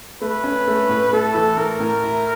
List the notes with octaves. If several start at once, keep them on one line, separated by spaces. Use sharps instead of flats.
A3 B4
C#4
A3
A2
A3 A4
E3
A2 A#4
A2
E4